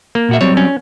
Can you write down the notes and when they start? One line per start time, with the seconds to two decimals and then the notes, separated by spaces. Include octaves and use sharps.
0.15 A#3
0.29 A#2 F#4 E5
0.41 F#3 G3 C4 C#5
0.57 C#4